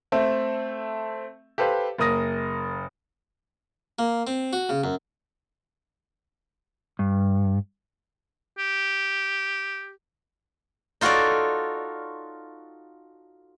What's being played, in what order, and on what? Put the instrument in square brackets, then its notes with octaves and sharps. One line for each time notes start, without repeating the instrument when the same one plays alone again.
[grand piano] A3 C4 A4 E5
G4 A4 B4 C5 F5
F#1 A#4 D#6 A#6
[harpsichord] A#3
C4
F#4
C#3
F#2
[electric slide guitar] G2
[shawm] G4
[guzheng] D#4 F4 F#4 A4 C#5 D5